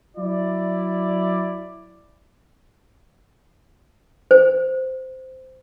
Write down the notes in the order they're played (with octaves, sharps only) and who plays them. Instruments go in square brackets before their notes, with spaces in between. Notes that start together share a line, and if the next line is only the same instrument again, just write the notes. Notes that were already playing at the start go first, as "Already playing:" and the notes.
[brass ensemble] F#3 E4 D5
[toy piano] C5